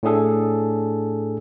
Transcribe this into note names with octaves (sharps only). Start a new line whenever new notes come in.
A2 A3 D4 G#4 A4